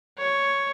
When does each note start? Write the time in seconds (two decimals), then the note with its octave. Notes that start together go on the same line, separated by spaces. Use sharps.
0.18 C#5